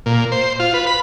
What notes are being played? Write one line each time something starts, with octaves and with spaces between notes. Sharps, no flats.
A#2
C5
F4
B4
B5